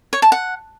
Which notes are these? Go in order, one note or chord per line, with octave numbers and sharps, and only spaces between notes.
C#5
A5
F#5